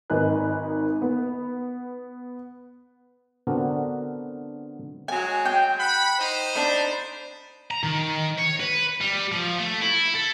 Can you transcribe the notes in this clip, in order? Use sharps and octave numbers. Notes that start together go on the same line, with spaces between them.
G#1 D#3 D#4 B4 G#5 F#6
B3
D3 B3 C4 D4 F#4 A#4
F#3 G#3 G#5
G5
F#5 B5
D#4 C5
D4 B5
A#5
D#3
C#5
B4
G3
F3
A3
E4
A4